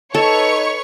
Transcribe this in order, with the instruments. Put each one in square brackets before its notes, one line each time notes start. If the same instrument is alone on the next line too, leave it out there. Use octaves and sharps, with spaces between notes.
[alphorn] D#4 [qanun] A4 [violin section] B4 C#5 C#6